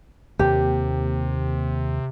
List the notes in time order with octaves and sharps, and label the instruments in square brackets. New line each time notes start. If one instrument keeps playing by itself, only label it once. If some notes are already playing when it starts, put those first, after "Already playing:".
[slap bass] D#2 A#3 [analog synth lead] C3 [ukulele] G4